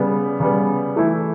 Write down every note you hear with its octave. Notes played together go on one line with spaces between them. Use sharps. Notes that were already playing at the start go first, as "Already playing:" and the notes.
Already playing: C#3 G3 B3
C#3 G3 B3
E3 A3 E4